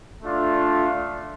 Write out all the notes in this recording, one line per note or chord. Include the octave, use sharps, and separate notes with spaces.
A3 D4 F4